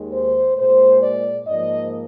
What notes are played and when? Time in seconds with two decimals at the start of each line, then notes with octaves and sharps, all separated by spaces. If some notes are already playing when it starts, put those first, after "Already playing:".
Already playing: D#2 D#3 G#3
0.13 C5
0.57 A#2 G#3 C5
1.02 D5
1.46 G#2 F3 A#3 D#5